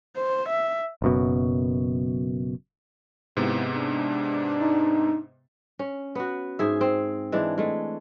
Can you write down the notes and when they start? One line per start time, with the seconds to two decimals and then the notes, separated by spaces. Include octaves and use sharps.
0.17 C5
0.49 E5
1.02 F#1 F#2 B2
3.37 D#2 G#2 C3 B3 E4
3.75 D4
4.61 D#4
5.79 C#4
6.15 B3 F#4
6.59 G#2 G#4 E5
6.81 C4
7.32 E3 G#3 D4
7.58 G#3 A3